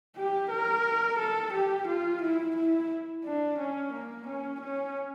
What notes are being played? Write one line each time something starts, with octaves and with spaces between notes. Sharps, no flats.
G4
A#4
A4
G4
F4
E4
E4
D4
C#4
A#3
C#4
C#4